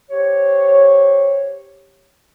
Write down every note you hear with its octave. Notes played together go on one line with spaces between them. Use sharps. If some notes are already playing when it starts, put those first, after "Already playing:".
G4 C5 C#5